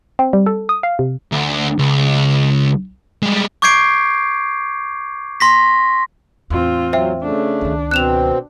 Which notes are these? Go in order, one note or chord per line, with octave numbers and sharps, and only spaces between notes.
C4
G3
A4
D#6
F5
C3
D2
C#2
G3 G#3
C#6 D6 G6 G#6 C7 D7
C6 A#6 B6
E2 A2 C4 F4
F#3 C5 E5 G5
C#3 A3 D4
C#2 D#3
B2 C4 F#6 E7 F7